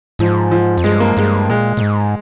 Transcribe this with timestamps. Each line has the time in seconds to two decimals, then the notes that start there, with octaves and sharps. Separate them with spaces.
0.19 G#2 F3
0.51 F3
0.78 F2
0.84 G2 G#3
1.00 A#3
1.17 G2 G#3
1.49 A#2 G#3
1.77 A#2
1.81 G#2